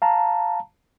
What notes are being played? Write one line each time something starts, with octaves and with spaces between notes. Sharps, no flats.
F5 A5 A#5